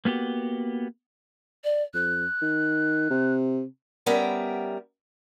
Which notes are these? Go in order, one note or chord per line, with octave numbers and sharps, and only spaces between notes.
A#3 B3 F#4 G4
D5
F2 F#6
D#3
C3
G3 B3 C#4 A#4 E5